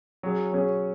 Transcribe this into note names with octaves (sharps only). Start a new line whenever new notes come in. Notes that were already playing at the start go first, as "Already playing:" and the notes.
F#3 C#4 G#4
F#3 C#4 G#4